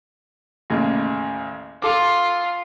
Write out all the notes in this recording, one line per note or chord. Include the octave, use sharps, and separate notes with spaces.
A1 D#2 C#3
F4 A4 D6